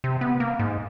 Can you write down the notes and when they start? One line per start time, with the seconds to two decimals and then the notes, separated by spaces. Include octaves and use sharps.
0.04 C3
0.21 B3
0.40 A#3
0.59 G#2